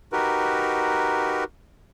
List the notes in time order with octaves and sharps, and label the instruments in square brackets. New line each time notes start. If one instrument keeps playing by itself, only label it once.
[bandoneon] D#4 F#4 G4 A#4 B4